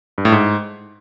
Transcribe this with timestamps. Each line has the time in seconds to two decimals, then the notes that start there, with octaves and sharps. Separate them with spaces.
0.18 G2
0.25 A2
0.32 G#2